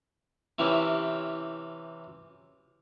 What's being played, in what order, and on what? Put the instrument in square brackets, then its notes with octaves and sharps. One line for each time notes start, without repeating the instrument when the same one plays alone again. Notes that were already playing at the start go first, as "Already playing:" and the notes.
[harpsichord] C3 E3 C#4 E4 G4